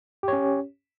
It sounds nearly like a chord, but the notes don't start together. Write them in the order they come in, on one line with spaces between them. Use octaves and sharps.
G4 C#5 C#4